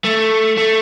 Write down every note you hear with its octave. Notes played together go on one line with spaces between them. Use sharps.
A3
A3